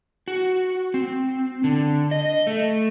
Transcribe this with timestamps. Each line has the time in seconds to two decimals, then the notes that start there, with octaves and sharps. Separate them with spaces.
0.28 F#4
0.94 C4
1.64 D3
2.11 D#5
2.47 A3